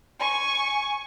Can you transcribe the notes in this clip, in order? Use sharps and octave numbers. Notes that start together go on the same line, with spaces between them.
G#5 C#6